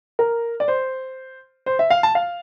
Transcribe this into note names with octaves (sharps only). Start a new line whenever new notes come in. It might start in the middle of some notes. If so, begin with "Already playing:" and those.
A#4
D5
C5
C5
E5
F5
A5
F5